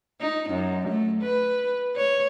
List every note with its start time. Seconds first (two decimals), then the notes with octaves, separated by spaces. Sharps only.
0.21 D#4
0.51 F#2
0.89 A3
1.23 B4
1.96 C#5